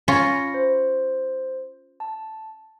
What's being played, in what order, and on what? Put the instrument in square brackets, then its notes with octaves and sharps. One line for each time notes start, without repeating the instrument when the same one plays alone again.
[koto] C#4 F4 [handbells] B5 A#6 C#7
[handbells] C5
A5